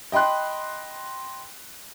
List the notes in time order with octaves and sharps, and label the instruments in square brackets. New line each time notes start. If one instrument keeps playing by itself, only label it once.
[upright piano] D#5 G5 B5 C6 F#6